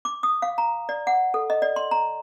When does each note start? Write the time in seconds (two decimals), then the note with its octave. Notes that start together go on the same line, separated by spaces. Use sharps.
0.05 D6
0.23 D#6
0.42 F5
0.58 A#5
0.89 D5
1.07 F#5
1.34 A4
1.50 D#5
1.62 D5
1.76 C6
1.91 A#5